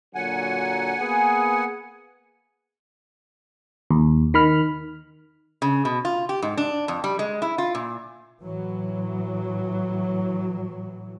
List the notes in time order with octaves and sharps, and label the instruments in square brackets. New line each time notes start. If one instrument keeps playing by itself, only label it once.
[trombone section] A#2 D3 F#3 [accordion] F#5 G#5
[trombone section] A#3 B3 G#4
[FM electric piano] D#2
D#3 B5 F6
[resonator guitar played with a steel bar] C#3
B2
F4
G4
G#2
D4
F2
G3
G#3
E4
F4
A#2
[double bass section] A2 E3 F#3